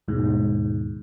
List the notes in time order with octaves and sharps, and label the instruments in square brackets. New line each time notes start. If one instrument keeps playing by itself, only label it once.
[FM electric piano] D#2 G#2 B2